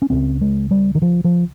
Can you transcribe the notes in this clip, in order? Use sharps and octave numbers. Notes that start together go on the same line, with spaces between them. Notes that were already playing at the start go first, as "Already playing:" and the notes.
C#4
C#2 C#3 C4
G#3
G3
D#3
F3
F3